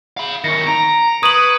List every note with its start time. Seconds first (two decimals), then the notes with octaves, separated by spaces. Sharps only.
0.17 F5 B5
0.44 D#3 C#4 A#6 C#7
0.67 A#5 D7
1.23 B4 C#6 D#6 G#6 D#7 F#7